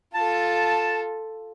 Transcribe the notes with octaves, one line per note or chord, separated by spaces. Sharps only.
F4 A4 A5